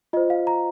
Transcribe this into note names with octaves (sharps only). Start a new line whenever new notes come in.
F4 C5 D#5
F5
A#5